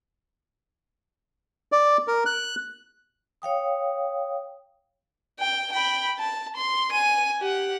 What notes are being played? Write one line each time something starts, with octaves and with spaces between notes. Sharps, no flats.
D5
A#4
F#6
C#5 F5 G5 D#6
G5
G5 B5
A5
C6
G#5 D#7
G4 F#5